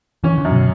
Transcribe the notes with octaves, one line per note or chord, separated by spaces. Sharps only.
E3 C#4
D3
F#2
B2